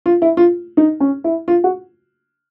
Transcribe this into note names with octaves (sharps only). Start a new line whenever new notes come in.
F4
E4
F4
D#4
C#4
E4
F4
F#4